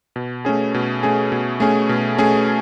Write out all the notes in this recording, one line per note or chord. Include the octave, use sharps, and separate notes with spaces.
B2
A3 C#4 G#4
B2
A3 C#4 G#4
B2
A3 C#4 G#4
B2
A3 C#4 G#4